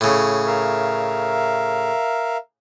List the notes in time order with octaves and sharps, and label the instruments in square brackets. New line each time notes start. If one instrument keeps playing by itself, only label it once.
[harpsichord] A2 C#3
[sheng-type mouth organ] A#4 E5 F5